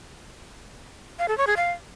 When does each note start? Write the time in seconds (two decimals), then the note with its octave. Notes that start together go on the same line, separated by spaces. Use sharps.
1.19 F5
1.28 A4
1.38 C#5
1.47 G#4
1.57 F5